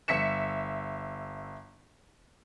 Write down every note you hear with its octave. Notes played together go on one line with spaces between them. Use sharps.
G1 E5 B6 C#7 E7